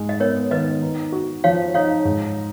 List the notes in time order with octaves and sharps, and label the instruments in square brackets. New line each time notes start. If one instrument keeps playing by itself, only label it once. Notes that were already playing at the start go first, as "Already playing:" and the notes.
Already playing: [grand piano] G#2 G#3
[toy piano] D#5
[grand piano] B3 [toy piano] A#4 C#5
[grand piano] D#3 [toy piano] B4 D#5
[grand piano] D#4
F#4
[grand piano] F3 [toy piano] C#5 F5
[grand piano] D#4 [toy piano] C#5 F5
[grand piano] G#2